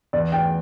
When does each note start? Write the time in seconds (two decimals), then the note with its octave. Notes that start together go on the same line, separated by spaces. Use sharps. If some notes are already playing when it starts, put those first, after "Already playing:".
0.13 E2 D5
0.32 G5